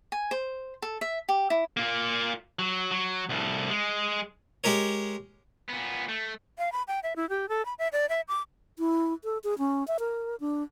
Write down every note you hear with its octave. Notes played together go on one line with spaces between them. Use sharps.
G#5
C5
A4
E5
G4
E4
A#3 F4
F#3
F#3
C2 A2
G#3
G#3 G4 A#4 C#5
A#2 B3
A3
F5
B5
G5
E5
E4
G4
A4
B5
E5
D5
E5
D6
E4
A4
G#4
C#4
E5
A#4
D4